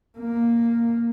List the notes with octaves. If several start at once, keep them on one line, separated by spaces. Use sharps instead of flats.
A#3